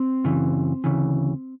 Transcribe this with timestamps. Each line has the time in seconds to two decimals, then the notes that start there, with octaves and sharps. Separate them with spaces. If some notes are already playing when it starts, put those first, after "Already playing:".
Already playing: C4
0.24 F#2 C#3 E3
0.84 D2 C#3 E3